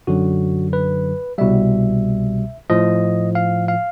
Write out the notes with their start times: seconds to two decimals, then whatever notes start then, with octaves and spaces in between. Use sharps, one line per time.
0.07 F#2 D3 F#3 F#4
0.73 B4
1.38 C2 B2 G3 E5
2.70 A2 F3 D#5
3.35 F5
3.68 F5